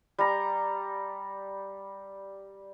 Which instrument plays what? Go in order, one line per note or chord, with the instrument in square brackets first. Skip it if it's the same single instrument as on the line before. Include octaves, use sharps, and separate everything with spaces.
[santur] G3 A#5